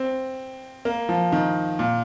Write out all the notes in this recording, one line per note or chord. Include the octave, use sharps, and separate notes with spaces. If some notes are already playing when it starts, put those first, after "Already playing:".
Already playing: C4
A#3
F3
D#3
A#2